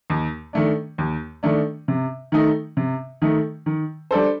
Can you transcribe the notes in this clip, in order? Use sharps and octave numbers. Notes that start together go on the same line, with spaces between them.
D#2
D#3 A3 D4
D#2
D#3 A3 D4
C3
D#3 A3 D#4
C3
D#3 A3 D#4
D#3
G3 D4 A4 C5